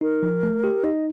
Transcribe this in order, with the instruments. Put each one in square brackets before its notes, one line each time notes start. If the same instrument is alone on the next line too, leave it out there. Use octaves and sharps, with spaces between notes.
[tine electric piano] D#4 [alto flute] A#4
[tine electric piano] F3
A3
G4
[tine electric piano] D#4 [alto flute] D#5